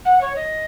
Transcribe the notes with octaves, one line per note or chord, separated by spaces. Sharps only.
F#5
C#5
D#5